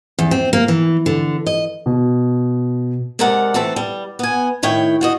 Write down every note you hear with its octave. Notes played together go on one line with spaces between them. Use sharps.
E2
C4
A#3
E3
D3
D#5
B2
C3 G#3 A4 A#4 D5 F#5
E3 A3 C4 A4
G3
B3 G#5
A2 D#3 E4 C#5 G5
F4 F#4 D#5